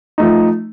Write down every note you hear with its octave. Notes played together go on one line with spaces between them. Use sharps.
F3 A3 D#4